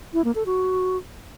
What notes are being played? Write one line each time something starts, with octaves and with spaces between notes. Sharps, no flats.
E4
A#3
A4
F#4